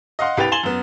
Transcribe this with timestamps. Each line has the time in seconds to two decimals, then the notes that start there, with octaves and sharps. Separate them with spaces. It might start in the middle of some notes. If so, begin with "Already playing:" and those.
0.19 D#5 F5 F#5 C6
0.37 C2 G4 B4 G5 A6 F7
0.52 G#5 C6 A6 E7 F#7 G7
0.63 F#2 B3